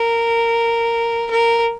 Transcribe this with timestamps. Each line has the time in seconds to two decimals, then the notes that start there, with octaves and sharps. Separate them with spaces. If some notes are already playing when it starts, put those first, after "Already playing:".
Already playing: A#4
1.31 A#4